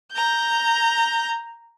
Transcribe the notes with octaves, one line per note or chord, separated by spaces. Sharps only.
A#5 G6